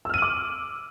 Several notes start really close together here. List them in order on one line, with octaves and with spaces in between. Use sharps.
E6 F6 D#7 F#7 D6